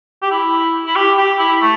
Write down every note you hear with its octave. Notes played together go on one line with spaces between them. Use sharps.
G4
E4
E4
G4
G4
E4
A3